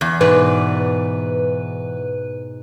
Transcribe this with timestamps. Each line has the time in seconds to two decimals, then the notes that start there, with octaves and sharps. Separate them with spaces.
0.01 E2
0.21 G#2 B2 B4 D5